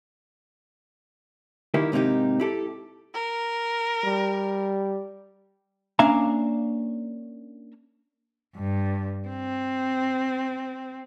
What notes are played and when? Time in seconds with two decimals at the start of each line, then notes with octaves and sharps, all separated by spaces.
1.74 D#3 A#3 E4 G4
1.92 G#2 C3 A#3 D#4 G4
2.40 E4 G4 A4
3.14 A#4
4.04 G3
5.99 A#3 C#4 D4 E5 F5 A#5
8.56 G2
9.28 C4